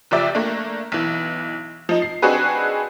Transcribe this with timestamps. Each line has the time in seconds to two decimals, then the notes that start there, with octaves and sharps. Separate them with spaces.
0.11 F#1 F3 G4 D5 E5
0.35 A3 A#3 D4
0.92 B1 E3
1.89 F3 D#4
2.02 C7
2.22 C4 D4 D#4 F#4 G#4 B4